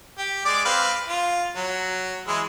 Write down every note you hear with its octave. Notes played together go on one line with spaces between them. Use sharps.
G4
G#3 D5 D6
C4 B4 F5
F4
F#3
E3 G#3 E4